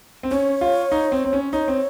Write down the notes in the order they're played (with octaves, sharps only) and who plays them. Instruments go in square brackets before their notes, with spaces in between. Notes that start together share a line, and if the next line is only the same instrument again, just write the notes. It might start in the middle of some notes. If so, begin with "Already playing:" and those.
[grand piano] C4
[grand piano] C#4 [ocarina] C#5
[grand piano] F4
D#4
C4
C4
C#4
[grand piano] D#4 [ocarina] C#5
[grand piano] C4